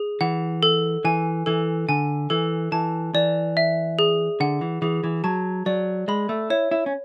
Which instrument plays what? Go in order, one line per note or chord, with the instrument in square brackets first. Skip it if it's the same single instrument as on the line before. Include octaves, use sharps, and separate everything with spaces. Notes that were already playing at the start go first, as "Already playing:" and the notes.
Already playing: [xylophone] G#4
[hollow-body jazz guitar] E3 [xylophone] F#5
[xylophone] A4
[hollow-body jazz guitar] E3 [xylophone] G#5
[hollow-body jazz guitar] E3 [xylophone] A4
[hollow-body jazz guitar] D3 [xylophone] G#5
[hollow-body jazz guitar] E3 [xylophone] A4
[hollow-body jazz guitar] E3 [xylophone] A5
[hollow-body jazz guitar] E3 [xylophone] D5
[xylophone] E5
G#4
[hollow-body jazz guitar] D3 [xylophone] F#5
[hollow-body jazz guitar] E3
[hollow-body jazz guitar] E3 [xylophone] G#4
[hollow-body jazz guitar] E3
[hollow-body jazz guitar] F#3 [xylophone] A5
[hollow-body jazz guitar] F#3 [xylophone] D5
[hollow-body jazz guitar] G#3 [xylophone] B5
[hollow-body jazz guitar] A3
[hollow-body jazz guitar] E4 [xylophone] C#5
[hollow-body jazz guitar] E4
C#4